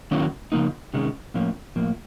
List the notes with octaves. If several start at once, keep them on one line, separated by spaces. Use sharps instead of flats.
D#3 F#3 A#3 C#4 E4
C#3 F3 A#3 D#4
C3 D#3 G#3 C#4
A2 F3 A#3 C#4
A2 F3 A#3